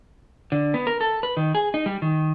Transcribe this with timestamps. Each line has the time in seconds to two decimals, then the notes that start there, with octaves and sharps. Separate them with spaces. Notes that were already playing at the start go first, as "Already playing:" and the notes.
0.52 D3
0.74 B3
0.87 A#4
1.01 A4
1.23 B4
1.37 D#3
1.55 G#4
1.74 D#4
1.86 G3
2.02 D#3